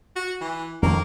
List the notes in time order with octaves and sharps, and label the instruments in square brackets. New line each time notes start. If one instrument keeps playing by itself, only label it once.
[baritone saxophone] F#4
E3
[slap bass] F2 D#3 [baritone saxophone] A#3